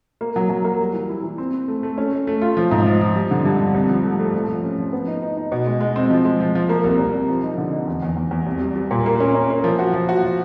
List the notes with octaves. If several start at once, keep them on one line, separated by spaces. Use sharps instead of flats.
A#3
F#3
F#3
A#3
G3
E3
E4
E3
C4
C4
A3
A3
C#4
A3
A3
F4
F3
G#2
F3
F3
G3
D3
G2
G2
C2
F3
A3
A3
F3
F3
C#4
F3
B3
D#4
D#4
D#4
B2
G#3
G#3
C4
F3
G#3
F3
F3
A#3
C2
C2
C2
F3
D#4
D3
D#4
E2
E2
E2
E2
C2
G3
G3
A#2
A#3
C#4
C#4
A#3
F3
F#4
F3
F#4
F3